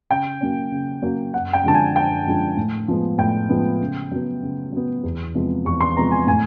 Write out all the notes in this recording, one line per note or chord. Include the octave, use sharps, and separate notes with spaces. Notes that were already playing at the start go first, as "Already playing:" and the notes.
C#3 G5
F#3 A#3 C#4
C#3
F#3 A#3 C#4
F#2 F#5
G5
D3 F3 G#3 A5
G#5
F#2 G5
D3 F3 G#3
A2
F3 G#3 B3
A2 G5
F3 G#3 B3
C#3
F#3 B3
C#3
F#3 B3
E2
C3 F3 G#3 B3
E2 C#6
C6
C3 F3 G#3 B3 A#5
G#5
A2 G#5